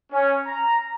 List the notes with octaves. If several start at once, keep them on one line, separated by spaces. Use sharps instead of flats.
C#4
A#5